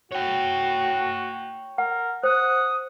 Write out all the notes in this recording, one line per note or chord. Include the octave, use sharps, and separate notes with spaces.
F#4 C#5 G5
A#4 F#5
C5 F#5 D#6